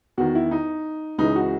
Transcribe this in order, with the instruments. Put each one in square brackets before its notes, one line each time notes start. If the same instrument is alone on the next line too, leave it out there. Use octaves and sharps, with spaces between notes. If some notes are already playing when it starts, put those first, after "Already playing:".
[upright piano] E2 D#3 F#4
E4
D#4
C#2 C#3 E3 D#4
F#4